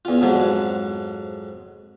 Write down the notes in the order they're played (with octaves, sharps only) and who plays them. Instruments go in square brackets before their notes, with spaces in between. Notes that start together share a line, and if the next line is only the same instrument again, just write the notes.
[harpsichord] E2 F4
F2 G#2 F3 F#3